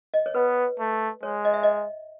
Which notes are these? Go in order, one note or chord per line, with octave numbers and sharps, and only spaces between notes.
D#5
C#5
B3 B4
A3
G#3 C#5
D#5
E5
D#5